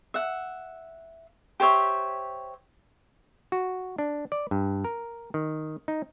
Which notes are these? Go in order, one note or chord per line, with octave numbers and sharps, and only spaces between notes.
E5 F#5
G4 C5 C#5 E5
F#4
D4
D5
G2
A#4
D#3
D#4